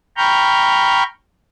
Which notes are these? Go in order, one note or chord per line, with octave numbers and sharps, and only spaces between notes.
G5 A#5 B5 C#6 F6 G6